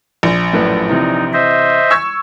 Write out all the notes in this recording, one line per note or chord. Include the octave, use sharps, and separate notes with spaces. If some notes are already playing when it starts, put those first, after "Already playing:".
A#1
F#2 A2 B4
C3 E3 D#4
C5 D#5 E5
C#6 E6 G#6